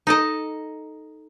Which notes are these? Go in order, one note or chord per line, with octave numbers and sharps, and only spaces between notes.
D#4 A4 D#5